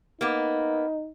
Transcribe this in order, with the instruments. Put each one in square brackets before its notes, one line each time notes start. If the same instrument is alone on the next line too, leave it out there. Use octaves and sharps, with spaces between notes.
[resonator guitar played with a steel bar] A#3 B3 [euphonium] D#4